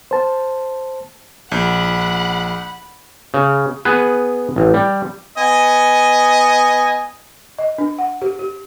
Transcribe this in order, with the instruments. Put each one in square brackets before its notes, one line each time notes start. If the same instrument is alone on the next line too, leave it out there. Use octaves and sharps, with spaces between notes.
[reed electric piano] C5 A5
[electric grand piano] A#1 [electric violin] F#5 B5
[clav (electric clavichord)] C#3
B3 G#4 B4
A1
G3
[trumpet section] B3 D#5 G#5
[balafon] D#5
D4
F#5
G4
G4